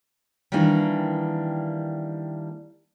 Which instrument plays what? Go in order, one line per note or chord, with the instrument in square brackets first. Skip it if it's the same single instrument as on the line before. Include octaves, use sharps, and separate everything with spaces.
[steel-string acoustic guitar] D#3 E3 G3 A#3 D4